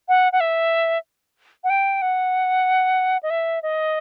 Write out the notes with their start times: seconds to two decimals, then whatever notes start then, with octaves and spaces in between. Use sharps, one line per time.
0.08 F#5
0.32 F#5
0.40 E5
1.64 F#5
1.70 G5
2.02 F#5
3.23 D#5
3.30 E5
3.63 D#5